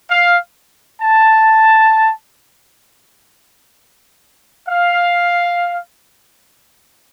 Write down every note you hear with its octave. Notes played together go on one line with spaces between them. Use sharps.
F5
A5
F5